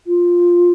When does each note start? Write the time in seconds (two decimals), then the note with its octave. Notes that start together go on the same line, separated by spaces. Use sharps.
0.07 F4